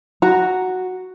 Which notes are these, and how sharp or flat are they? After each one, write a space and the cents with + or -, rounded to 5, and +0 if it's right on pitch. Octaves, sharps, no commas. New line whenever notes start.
F#4 +0 A#5 +0